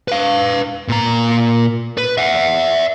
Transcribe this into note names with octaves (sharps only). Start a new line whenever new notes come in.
B4 F5
A#2 A#5
B4
E5 F#5